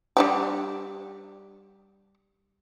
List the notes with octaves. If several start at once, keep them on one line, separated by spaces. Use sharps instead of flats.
G3 D4 G4